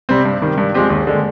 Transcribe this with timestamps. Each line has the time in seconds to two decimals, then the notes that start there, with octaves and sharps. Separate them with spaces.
0.09 C3 G3 C4
0.25 G2
0.42 D#3 G3
0.58 G2
0.74 F3 G#3 C4 G4
0.90 D#2
1.07 D3 G#3